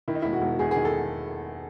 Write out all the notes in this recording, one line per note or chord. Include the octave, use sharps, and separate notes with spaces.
D#3 E4
D#4
E1 E4
F#4
E1
E2 G#4
G#4
D#3
A4